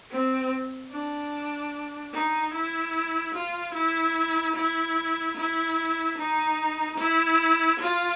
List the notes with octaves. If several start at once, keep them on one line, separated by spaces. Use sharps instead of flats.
C4
D4
D#4
E4
F4
E4
E4
E4
D#4
E4
F4